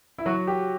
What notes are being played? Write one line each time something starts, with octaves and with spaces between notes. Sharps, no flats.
E4
F#3 F#4
G4